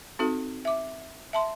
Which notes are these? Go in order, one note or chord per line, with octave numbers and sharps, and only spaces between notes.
C4 D#4 F#4 A4
E5 D6
E5 A5 C6